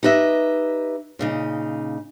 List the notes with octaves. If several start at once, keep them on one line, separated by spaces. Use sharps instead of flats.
D#4 G4 B4 D#5 E5
A#2 C#3 D#4